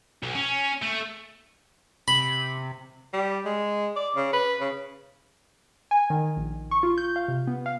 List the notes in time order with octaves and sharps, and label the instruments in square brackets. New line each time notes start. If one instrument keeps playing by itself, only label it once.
[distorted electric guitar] B1
C#4
A3
[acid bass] C3 [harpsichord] B5
[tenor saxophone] G3
G#3
D5
C#3
B4
C#3
[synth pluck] G#5
D#3
A#1
C#6
F4
G6
F5
C3
B3
F5